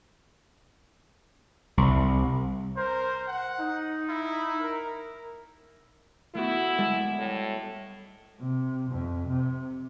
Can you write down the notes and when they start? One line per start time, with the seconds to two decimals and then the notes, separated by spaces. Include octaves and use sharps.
1.77 C2
2.77 A#4 C5
3.28 F#5
3.60 D#4
4.09 E4
4.61 A#4
6.35 A3 B3 E4 F#4
6.78 G3 G#3 D5
7.18 A2
8.40 C3
8.90 F2
9.27 C3